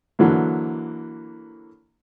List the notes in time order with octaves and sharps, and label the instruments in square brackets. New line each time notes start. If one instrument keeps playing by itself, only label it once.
[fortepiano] D3 E3 F#3 A#3